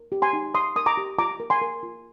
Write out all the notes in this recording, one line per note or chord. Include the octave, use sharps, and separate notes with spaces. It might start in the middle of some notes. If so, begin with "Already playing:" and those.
Already playing: A#4
G4
G#5 C6
D#4
D#4 C6 D#6
A#4 D#6
A#5 D6
G4
F4 A#5 D6
A#4
G#5 C6
A#4
F4